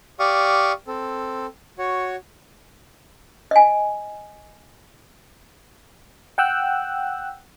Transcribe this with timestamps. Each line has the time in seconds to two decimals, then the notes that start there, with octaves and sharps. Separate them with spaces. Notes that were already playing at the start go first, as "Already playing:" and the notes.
0.19 G4 D5 F5 C#6 D#6
0.87 C4 A4
1.78 F#4 C#5
3.51 D#5 G#5
6.38 F#5 G5 E6 F#6